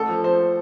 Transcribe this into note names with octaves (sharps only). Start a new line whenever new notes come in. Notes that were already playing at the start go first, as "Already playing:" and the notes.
Already playing: A1 A4
F3
F3 C5